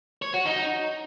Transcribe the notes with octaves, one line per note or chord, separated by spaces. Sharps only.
C#5
F#4
D#4